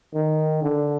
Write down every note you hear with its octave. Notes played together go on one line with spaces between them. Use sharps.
D#3
D3